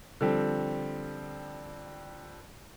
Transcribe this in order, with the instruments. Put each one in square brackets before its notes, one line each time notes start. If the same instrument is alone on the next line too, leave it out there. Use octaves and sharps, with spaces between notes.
[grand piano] D3 F3 G3 C4